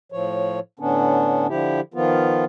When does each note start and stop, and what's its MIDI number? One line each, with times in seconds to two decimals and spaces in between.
0.12 0.60 45
0.12 0.60 53
0.12 0.60 73
0.79 1.47 45
0.79 1.47 50
0.79 1.47 59
0.79 1.47 61
0.79 1.47 62
1.49 1.81 50
1.49 1.81 53
1.49 1.81 64
1.49 1.81 67
1.94 2.45 51
1.94 2.45 53
1.94 2.45 59
1.94 2.45 65